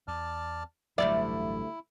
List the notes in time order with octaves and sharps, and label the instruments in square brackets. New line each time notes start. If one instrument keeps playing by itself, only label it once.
[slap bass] E2 [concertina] D5 A5 F6
[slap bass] A1 G2 F#3 [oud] D2 G3 D5 [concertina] E4 [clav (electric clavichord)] E5